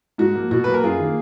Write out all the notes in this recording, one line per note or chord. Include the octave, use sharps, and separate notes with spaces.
G#2 F#4
F3 A#3
B2 F#4
F#3 A#3 B4
A#4
F#2 F4 G#4
D#3 A#3